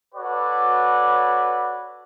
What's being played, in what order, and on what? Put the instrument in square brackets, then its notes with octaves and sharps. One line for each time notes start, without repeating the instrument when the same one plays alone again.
[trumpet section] F#4 A4 B4 C#5 D5